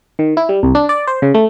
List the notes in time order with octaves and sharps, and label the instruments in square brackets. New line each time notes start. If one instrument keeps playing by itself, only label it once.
[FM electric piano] D#3
E4
G3
C2
D4
D5
C5
C#3
A3